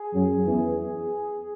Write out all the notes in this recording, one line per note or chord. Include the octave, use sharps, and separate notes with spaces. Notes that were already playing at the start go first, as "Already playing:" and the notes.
Already playing: G#4
F#2 F#3
E2 E3